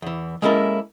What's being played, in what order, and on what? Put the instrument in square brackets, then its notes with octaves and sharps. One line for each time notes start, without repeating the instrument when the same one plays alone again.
[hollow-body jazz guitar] E2 E3
G#3 A#3 C#4 E4 A4 A#4